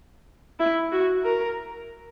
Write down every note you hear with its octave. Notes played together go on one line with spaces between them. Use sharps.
E4
F#4
A#4